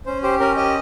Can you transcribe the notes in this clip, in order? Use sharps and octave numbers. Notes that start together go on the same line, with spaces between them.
C#4 C5
G4 C5
C#4 A#4
G4 D#5